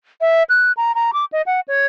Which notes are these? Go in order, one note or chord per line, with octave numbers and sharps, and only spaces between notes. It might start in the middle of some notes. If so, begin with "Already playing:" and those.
E5
F#6
A#5
A#5
D6
D#5
F#5
C#5